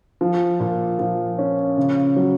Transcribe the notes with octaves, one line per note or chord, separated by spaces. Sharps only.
F3
A#2
F3
C#4
C#3
F#3